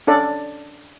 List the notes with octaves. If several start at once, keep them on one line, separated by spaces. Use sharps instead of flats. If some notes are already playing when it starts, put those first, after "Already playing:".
C#4 D4 A4 D5